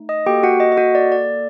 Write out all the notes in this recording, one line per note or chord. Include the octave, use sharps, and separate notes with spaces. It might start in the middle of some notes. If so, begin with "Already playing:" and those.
Already playing: A3 D#4
D#5 D#6
A#3 F#4 G4 A4 G5
F#4 F#5
D#5
D#5
F#4 F#5
D5
D5